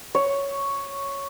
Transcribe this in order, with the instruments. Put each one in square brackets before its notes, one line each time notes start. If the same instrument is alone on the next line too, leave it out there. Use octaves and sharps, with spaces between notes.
[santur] C#5